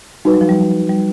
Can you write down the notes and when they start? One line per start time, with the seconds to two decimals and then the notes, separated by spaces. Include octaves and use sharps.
0.25 G3 D#4 F#4 B4
0.34 F#3
0.41 F3
0.49 G3
0.89 G3